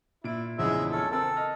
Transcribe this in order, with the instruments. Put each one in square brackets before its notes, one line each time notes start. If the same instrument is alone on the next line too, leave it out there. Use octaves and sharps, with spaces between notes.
[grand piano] A#2 D7 [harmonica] E4
[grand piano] A#1 E2 C#3 [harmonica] G#3 E5
[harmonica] C#4 A4
[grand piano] C4 A#4 [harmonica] A4
[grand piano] D#5 F6